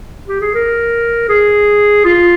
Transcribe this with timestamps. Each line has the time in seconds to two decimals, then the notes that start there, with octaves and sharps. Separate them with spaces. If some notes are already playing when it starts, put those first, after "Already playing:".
0.28 G4
0.41 G#4
0.54 A#4
1.29 G#4
2.05 F4